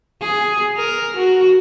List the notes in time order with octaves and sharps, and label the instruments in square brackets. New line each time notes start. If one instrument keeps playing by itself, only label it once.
[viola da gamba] G#4
A#4
F#4